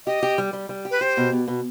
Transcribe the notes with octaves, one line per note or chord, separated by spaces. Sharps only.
G4 D#5
G4
G3
G3
G3
G4
B4
G4 C5
B2
B2
B2